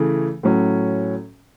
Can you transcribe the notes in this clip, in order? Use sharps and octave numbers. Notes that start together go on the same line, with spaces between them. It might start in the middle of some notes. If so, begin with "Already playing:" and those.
Already playing: C#3 E3 A3
A2 F#3 C#4